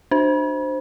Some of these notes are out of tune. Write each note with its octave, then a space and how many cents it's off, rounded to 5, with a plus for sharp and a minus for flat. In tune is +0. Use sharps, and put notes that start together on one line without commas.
D4 +30 C5 +0